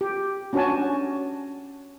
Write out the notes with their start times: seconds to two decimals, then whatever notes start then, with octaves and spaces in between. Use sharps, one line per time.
0.01 G4
0.53 C#4 D4 F#4 C#5 G#5 A5